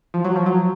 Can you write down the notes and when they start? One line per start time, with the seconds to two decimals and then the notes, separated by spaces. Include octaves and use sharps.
0.14 F3
0.25 F#3
0.36 F3
0.46 F#3